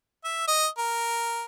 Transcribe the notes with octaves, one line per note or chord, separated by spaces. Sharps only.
E5
D#5
A#4